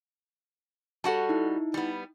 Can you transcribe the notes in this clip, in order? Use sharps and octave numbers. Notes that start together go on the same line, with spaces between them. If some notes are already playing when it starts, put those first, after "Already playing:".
G3 F#4 A4 F#5 A5
D#4 E4
G3 B3